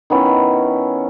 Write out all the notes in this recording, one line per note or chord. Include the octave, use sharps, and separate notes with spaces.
D#3 B3 C#4 E4